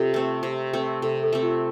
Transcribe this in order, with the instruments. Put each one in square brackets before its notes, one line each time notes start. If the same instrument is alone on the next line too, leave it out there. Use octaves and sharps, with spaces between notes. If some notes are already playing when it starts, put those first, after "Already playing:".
Already playing: [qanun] C3 [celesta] F4 G4 A4
[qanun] A3 C4
C3
A3 C4
[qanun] C3 [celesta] A4
[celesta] A4
[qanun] A3 C4
[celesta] F4